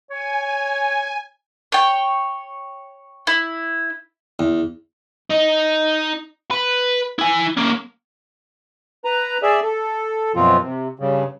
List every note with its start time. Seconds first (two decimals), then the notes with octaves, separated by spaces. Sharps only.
0.11 C#5 G#5
1.72 C#5 G5
3.27 E4
4.39 E2
5.31 D#4
6.51 B4
7.19 E4 G#5
7.57 A#3 C#4
9.05 B4 A#5
9.43 G#4 D5 E5
9.63 A4
10.35 F#2 B2 F3 C4 F4
10.61 C3
10.99 G2 C#3